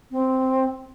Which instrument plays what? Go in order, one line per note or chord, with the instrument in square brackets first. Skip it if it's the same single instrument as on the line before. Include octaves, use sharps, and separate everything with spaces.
[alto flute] C4